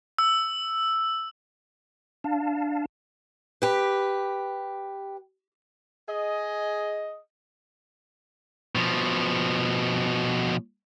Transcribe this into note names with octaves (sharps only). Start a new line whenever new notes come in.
E6
D4 F5 A5
G4 B4
G#4 D#5
B2 F3